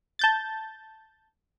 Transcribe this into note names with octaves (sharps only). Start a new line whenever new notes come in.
A5 G6 A6